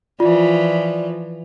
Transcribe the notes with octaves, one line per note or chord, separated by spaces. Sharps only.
E3 F3 F4 D5